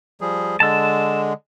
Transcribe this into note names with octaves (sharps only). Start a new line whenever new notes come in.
F3 G3 G#4
D3 G#3 A5 E6